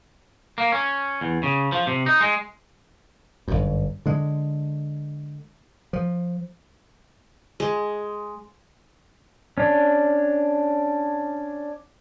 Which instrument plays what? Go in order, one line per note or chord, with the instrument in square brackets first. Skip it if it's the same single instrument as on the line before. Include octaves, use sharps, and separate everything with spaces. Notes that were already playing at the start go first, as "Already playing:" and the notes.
[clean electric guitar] A#3
C#4
E2
C#3
F3
C3
D#4
G#3
[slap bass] G1 F#2
D3 G#3
F3
[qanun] G#3
[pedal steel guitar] C#4 D4